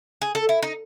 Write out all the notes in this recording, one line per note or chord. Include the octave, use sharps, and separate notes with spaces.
G#4
A4
E4
D#4